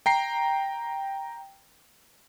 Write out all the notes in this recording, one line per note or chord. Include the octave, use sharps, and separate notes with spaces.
G5 A#5 C7